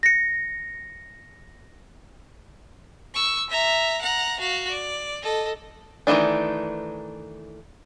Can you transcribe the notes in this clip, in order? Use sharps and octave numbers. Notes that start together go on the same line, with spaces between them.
A#6 C#7
C#6 E6
E5 A#5
F#5 A#5
F#4 F5
D5
A4 D#5
D#3 E3 F#3 A3 D4